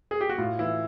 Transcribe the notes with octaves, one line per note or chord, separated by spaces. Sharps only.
G#4
G4
F#4
A2 F4
E3 E4